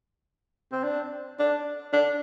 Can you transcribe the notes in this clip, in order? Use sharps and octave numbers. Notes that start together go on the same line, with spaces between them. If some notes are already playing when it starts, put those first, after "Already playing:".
C4
D4
D4
D4